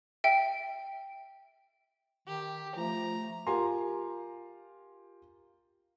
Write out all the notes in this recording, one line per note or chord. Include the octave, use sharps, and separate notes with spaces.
E5 G5
D#3 G4
F3 A3 A#5
F4 G4 A#4 G#5 A#5 C6